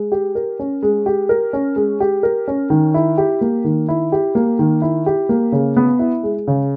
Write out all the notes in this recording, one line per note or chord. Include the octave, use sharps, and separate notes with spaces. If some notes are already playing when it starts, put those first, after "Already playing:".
Already playing: G#3
G4
A#4
C#4
G#3
G4
A#4
C#4
G#3
G4
A#4
C#4
D#3
E4
G4
A#3
D#3
E4
G4
A#3
D#3
E4
G4
A#3
C#3
B3
E4
G#3
C#3